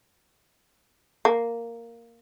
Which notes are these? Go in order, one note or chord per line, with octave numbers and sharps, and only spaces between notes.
A#3